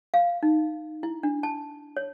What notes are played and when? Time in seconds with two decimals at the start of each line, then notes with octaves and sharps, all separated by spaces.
0.14 F5
0.43 D#4
1.03 E4
1.23 D4
1.43 A5
1.97 C#5